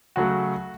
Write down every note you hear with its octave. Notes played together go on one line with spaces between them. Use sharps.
C#3 F#3 A3 F#4